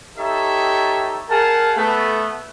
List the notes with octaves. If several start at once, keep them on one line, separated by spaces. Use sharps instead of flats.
D#4 G4 A4 C#5 D#5 E5
G#4 A#4 F5 F#5 A5
A3 B3